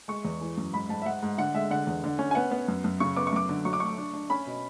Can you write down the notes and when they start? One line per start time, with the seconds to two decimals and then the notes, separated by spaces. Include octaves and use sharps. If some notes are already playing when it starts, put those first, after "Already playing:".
0.08 G#3 C#6
0.25 E2
0.41 E3
0.57 F#2
0.73 G#2 B5
0.89 G#2 A5
1.02 E5
1.06 G#2 F#5
1.23 G#2
1.38 D3 F#5
1.54 G#3 E5
1.71 D3 F#5
1.87 E2
2.04 D3
2.19 C#4
2.31 G#5
2.35 B3 F#5
2.51 B3
2.68 F#2
2.84 F#2
3.00 C#3 C#6
3.17 B3 D6
3.27 C#6
3.32 F#2 D6
3.49 D3
3.65 F#3 C#6
3.73 D6
3.80 A3 C#6
3.98 D4
4.14 D4
4.30 C#4 B5
4.46 B2